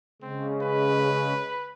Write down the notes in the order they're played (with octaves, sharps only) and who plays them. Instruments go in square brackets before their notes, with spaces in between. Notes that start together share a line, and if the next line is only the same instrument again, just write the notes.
[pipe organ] C#3 [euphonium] G#3 [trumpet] C4
[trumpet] B4